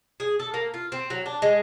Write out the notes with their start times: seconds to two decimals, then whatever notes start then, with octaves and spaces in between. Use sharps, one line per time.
0.20 G#4
0.40 A4
0.54 A#3
0.74 F4
0.92 C4
1.10 F#3
1.26 D4
1.42 G#3